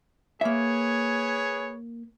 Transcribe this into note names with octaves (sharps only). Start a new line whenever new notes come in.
A#3 G#4 B4 C#5 E5